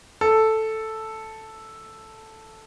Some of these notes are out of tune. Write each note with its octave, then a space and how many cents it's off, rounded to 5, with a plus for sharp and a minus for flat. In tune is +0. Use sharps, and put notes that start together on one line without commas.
A4 +0